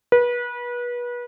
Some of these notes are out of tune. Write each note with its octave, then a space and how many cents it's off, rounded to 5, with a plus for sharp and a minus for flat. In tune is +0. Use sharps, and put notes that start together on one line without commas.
B4 -30